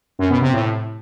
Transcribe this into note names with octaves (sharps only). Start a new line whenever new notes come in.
F#2
B2
C3
A2